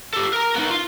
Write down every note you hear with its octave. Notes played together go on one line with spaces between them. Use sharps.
G4 A4
A#4 A#5
B3 D#4
F4